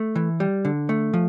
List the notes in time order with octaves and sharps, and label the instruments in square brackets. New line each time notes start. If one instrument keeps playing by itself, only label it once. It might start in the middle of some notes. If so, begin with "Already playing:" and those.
Already playing: [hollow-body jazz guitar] A3
E3
G3
D3
A3
F3